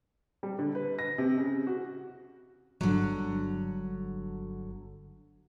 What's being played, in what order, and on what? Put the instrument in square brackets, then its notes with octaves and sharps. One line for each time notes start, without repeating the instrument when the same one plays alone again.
[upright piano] G3
D3
B4
A#6
C3
C#3
F#4
[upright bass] G1 [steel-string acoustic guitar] D3 F#3